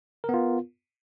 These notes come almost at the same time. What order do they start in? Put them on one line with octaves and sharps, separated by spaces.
A#4 B3 F4